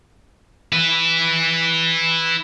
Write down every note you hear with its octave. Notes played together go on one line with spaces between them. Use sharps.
E4 B4